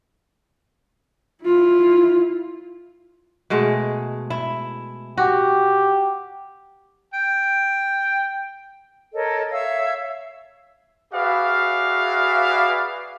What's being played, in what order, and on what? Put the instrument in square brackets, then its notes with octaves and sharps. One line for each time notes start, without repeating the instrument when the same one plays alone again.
[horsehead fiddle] E4 F4
[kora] B2 G#3 A3
E4
[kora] F#4 [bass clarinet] G4
[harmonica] G5
[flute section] A4 A#4 C#5 D#5
C#5 E5 F5 E6
[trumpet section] F#4 G#4 B4 D5 E5 F5